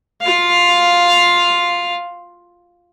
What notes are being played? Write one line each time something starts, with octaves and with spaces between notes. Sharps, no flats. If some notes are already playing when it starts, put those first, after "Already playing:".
F4 F5